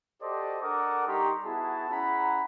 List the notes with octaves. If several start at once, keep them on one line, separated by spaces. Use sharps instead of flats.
F#4 G4 A4 C5 D5 D#5
D4 A4 A#4 F#5 D6 D#6
G3 D#4 G4 A#5 C6 C#6
B3 E4 F#4 G#4 A5
C#4 E4 G#4 F#5 A#5 B5